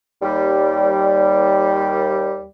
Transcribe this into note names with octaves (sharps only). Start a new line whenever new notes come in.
D#2 G3